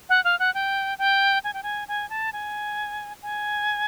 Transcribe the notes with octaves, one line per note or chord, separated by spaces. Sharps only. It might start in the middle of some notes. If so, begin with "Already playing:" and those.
F#5
F5
F#5
G5
G5
G#5
G5
G#5
G#5
A5
G#5
G#5